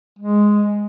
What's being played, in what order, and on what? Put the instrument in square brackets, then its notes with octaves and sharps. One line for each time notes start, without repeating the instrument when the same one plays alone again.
[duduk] G#3